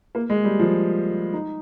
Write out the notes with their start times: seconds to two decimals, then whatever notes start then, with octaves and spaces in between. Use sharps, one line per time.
0.15 A#3
0.30 G#3
0.44 G3
0.59 F3
1.33 D#4